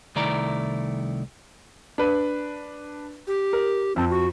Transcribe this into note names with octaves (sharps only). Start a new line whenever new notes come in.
C2 D#3 A3 E4 D5 A#5
D4 B4
G4
A#4
F2 C4 A5
F#4